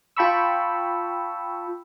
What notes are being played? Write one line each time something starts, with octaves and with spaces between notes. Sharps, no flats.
F4 G5 A5 B5 C#6 E6